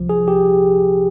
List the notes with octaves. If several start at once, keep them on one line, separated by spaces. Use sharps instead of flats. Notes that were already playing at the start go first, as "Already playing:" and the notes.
Already playing: C2 C3 F3
G#4
G4